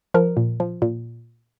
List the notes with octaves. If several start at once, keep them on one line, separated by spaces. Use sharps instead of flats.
F3 A#4
A#2
F3
A#2